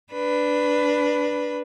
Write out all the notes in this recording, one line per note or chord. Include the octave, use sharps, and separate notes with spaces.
D4 B4